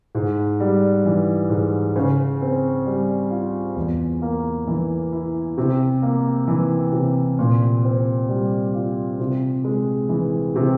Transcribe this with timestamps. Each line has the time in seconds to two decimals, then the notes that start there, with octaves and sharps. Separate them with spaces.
0.15 G#2
0.60 G3
1.05 E3
1.50 G#2
1.96 C#3
2.41 C4
2.86 G3
3.31 F4
3.76 E2
4.22 A#3
4.67 E3
5.12 E4
5.58 C3
6.02 A#3
6.48 E3
6.92 C3
7.39 A#2
7.84 C4
8.29 G3
8.74 F4
9.19 C3
9.64 G#3
10.09 E3
10.55 C3